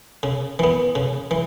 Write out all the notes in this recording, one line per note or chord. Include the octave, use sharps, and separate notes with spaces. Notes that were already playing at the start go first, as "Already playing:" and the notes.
C#3
E3 B3
C#3
E3